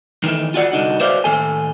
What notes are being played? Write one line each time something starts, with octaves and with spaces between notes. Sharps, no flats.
D#3 E3 A3
F4 F#4 D5 F#5
C2 D3 D#4 F#4
F#4 B4 C5 D5 E5 F5
A2 D#3 A4 G#5